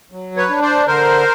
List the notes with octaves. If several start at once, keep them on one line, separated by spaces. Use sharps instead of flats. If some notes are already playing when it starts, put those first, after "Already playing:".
F#3
B4 C#5
D4
C5 D5
D3 A#4 C5